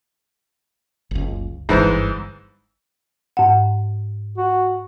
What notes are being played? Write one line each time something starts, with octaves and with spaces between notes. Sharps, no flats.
F#1 C#2
D1 G1 G#2 E3 C5
G#2 F#5
F#4